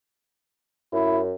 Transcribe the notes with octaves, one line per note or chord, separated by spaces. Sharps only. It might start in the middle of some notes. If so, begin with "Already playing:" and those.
F#2 E4